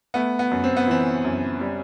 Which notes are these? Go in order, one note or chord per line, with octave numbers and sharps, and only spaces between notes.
A3 B3
B3
F#2
C4
B3
E3 C4
F#2
G3